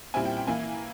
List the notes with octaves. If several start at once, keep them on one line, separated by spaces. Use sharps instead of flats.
A#2 G3 C4 E4 G#5
G5
G5
E3 A#3 E4 G#5